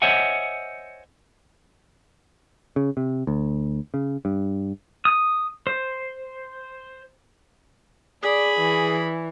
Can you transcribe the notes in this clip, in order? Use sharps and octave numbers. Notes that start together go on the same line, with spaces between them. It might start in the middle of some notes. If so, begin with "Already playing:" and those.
C5 C#5 D#5 E5 F#5 G#5
C#3
C3
D2
C#3
G2
D#6
C5
G#4 D5 B5
E3